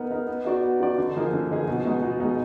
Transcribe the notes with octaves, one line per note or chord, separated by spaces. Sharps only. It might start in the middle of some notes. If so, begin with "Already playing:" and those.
Already playing: B3 D#4 A#4
D#4 A#4
B3
D#4 F#4 D5
B3
D#4 F#4 D5
D3
F3 A#3 D#4 G#4
D3
F3 A#3 D#4 G#4
B2
G#3 B3 D#4
B2
G#3 B3 D#4